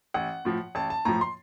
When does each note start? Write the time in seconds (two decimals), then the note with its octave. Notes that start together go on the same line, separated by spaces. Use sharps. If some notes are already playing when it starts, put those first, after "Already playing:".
0.14 A1 F#5
0.45 A2 F3
0.75 A1 A5
0.90 A5
1.05 A2 F3 A#5
1.21 C6